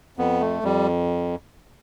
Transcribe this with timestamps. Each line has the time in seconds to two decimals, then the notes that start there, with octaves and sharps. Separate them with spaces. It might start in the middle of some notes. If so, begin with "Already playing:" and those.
0.17 F2 B3
0.41 A3
0.63 F2 G3